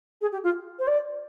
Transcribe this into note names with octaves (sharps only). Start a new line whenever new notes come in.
G#4
G4
F4
C5
D5